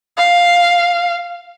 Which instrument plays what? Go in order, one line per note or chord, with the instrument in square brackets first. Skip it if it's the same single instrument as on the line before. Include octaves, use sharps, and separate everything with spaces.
[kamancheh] F5